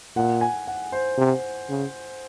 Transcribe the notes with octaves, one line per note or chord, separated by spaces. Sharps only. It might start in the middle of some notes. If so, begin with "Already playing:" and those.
A#2 F#5
G#5
F#5
C5
C3
C#3